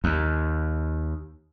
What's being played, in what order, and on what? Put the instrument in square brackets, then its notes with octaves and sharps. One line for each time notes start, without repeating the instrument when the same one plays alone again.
[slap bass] D#2